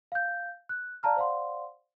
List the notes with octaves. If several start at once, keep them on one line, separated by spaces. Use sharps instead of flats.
F5 G6
F#6
D5 F5 A5 A#5 F6
C5 D5 F5 F#5 C6